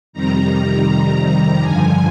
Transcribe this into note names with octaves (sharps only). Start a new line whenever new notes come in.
F2 C3 D#3 G3 A#5
G2 D3 F3 G#5